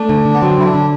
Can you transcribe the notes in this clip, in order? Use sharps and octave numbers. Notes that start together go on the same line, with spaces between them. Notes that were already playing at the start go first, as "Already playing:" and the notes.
Already playing: A3 D4
D3
D3
B3
F#3 C4
D3 E4
D4
D3